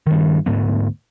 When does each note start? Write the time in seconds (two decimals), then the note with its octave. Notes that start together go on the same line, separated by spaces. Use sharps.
0.07 G2 D#3
0.46 D2 G#2 A3 B3